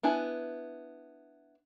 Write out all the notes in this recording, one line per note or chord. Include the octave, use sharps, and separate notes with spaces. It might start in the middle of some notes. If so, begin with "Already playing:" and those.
B3 D4 E4 G#5